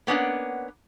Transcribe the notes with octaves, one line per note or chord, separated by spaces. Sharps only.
A#3 B3 C#4 D4 F#5